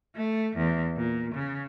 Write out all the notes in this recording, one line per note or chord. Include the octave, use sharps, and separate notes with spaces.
A3
E2
A#2
C#3